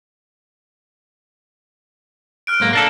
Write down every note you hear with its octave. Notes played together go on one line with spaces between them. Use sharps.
F6 F#6 D7
B1 G#2 A#3
A#3 D4 A4